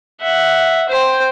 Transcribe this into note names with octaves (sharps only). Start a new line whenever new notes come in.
E5 F#5
C5 G5